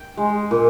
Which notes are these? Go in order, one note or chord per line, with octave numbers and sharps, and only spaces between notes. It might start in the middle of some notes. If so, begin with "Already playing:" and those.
Already playing: G5
G#3
A#2